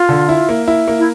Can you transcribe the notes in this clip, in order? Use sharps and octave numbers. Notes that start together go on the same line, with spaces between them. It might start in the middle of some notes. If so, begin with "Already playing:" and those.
Already playing: F4
D3
E4
A#3
E4
A#3
E4